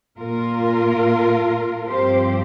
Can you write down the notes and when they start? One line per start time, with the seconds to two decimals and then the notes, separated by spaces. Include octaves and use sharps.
0.18 A#2 A#3 F4 A#4
1.87 G2 F3 C4 G4 C5